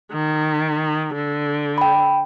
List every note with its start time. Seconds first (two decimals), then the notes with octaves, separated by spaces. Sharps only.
0.12 D#3
1.14 D3
1.78 G5 B5